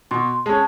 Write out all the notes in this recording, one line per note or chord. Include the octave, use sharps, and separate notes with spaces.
B2 C6
G#3 C#4 A5